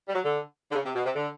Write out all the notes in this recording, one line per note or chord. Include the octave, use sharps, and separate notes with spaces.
G3
F#3
D3
D3
C#3
C3
B2
C3
D3